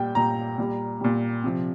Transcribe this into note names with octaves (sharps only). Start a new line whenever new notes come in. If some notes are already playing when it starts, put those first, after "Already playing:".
Already playing: A#2 G3 G5
A#2 G3 A#5
A#2 G3
A#2 G3
C3 F3